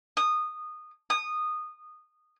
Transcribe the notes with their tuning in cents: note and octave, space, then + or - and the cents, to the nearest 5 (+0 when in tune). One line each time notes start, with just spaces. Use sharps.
D#6 -15
D#6 -15